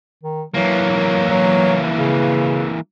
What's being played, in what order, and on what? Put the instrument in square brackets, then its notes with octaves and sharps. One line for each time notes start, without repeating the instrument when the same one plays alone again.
[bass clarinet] D#3
[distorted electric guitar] E3 A#3 [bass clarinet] F#3
[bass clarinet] F#3
C#3